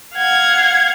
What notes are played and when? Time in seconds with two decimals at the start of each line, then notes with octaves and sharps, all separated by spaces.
0.14 F5 F#5 G#6